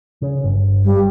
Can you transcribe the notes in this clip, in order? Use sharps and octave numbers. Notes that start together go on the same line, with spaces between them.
C#3
G1
G3